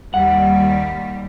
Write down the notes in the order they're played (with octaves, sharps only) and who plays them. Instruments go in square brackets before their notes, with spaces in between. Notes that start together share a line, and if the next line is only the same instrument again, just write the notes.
[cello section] D#2 G3 [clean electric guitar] F#5